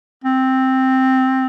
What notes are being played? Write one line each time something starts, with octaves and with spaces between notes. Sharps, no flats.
C4